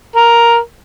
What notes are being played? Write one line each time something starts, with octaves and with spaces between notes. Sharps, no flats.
A#4